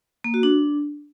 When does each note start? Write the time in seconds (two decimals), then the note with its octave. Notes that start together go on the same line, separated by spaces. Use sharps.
0.24 A#3
0.34 F#4
0.43 D4